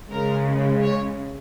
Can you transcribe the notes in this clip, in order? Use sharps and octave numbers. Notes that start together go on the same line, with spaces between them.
C#3 G#3 A#4
C#5